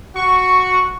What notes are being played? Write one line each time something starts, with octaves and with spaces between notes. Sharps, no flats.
F#4 C#6